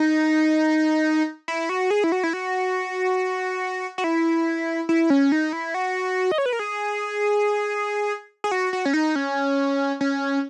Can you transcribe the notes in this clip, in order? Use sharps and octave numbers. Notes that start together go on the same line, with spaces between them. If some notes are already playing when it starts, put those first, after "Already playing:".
Already playing: D#4
E4
F#4
G#4
E4
F#4
E4
F#4
F#4
E4
E4
C#4
D#4
E4
F#4
D#5
C#5
B4
A#4
G#4
G#4
F#4
F#4
C#4
D#4
C#4
C#4